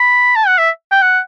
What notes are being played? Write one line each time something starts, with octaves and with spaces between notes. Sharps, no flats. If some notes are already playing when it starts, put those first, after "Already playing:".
Already playing: B5
A5
F#5
E5
G5
F#5